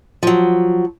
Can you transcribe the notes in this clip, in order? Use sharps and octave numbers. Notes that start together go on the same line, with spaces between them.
F3 F#3